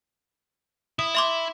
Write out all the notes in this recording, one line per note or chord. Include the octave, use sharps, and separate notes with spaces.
E4 D#6
E5 C6 D6